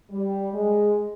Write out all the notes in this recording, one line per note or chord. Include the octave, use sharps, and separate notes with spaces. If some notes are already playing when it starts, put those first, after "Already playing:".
G3
G#3